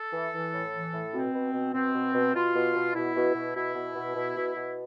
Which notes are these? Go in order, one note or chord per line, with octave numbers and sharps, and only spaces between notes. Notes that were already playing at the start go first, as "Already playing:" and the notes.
Already playing: A4
E3
E3
A2
E3
A2
B2 C4
B2
B2
B2 C4
B2
B2
B2 F4
B2
B2
B2 E4
B2
B2
B2 E4
B2
B2
B2
B2
B2